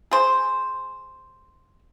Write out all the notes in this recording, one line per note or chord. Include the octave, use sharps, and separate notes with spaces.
G#4 C5